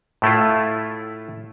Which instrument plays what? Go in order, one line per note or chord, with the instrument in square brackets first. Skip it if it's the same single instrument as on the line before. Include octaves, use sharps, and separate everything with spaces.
[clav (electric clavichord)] A2 A3 E4 F4